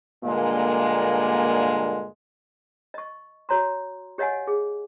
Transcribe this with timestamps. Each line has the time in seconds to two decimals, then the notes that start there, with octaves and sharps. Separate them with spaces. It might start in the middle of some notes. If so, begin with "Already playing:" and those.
0.24 G2 A#2 D3 G#3 A#3
2.94 D#5 C#6
3.49 F#4 C#5 A#5 C6
4.18 G4 C#5 D#5 F5 F#5 G#5
4.47 G#4